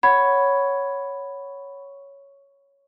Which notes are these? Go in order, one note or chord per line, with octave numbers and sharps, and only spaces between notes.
C#5 F#5 B5 G#6